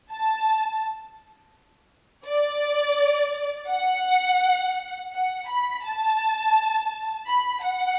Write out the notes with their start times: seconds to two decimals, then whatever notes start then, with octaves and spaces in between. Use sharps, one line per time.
0.11 A5
2.26 D5
3.69 F#5
5.13 F#5
5.48 B5
5.85 A5
7.27 B5
7.63 F#5